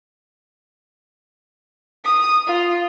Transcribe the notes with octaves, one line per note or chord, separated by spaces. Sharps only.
D#6
F4